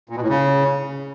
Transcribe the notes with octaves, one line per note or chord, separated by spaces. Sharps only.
A#2
B2
A2
C#3